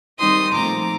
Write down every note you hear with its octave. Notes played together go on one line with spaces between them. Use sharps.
D#3 G3 C4 D#4 C6 D#6
A#2 F3 A3 C4 D#4 A#5 D6